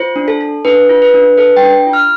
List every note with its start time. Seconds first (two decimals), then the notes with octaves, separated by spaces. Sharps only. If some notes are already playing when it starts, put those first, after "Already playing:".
Already playing: F4 C5
0.16 D4
0.28 A4
0.41 A4
0.65 D4 B4
0.89 F4
1.02 B4
1.14 D4
1.38 A4 B4
1.57 G5
1.62 D4
1.87 F4
1.93 F6